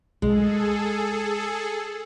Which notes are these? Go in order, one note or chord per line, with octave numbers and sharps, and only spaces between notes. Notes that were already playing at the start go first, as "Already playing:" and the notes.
C2 G#3 G#4 A4